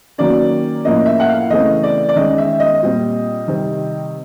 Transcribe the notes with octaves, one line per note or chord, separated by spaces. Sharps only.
D#3 F#3 A#3 C#4 D5
A2 F3 A#3 C#4 D#5
E5
F#5
F5
C#3 E3 A3 C4 D#5
D5
D5
D#3 G#3 C#4 D#5
E5
D#5
A#2 G3 C4
C3 D#3 G3 C4